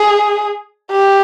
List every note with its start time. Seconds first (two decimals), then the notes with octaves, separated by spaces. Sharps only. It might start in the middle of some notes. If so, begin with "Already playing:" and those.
Already playing: G#4
0.92 G4